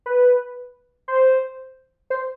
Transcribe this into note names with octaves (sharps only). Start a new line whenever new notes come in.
B4
C5
C5